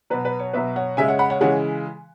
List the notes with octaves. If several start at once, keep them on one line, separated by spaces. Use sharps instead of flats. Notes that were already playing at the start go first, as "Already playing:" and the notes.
B2 F#3 B4
B4
C#5
B2 F#3 B4 E5
C#5 F#5
C#3 G#3 E5 G#5
C#5 F#5
F#5 B5
C#5 F#5
C#3 E3 G#3 C#5 F#5